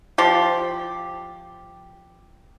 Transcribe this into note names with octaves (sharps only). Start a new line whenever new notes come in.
F3 G4